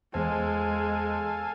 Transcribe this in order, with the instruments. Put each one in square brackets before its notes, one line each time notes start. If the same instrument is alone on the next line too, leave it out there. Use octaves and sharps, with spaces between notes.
[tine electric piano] E2 C5 [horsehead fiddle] G#3 [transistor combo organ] A4 F5 G#5